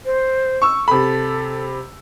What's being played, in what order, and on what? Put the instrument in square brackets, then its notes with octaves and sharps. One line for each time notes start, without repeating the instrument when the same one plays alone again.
[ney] C5
[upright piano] C#6 E6
[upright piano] C3 B5 [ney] A4